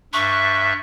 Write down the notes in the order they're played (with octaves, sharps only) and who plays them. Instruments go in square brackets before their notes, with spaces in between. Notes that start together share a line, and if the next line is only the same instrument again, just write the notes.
[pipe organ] G2 E5 F#6 [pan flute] C#6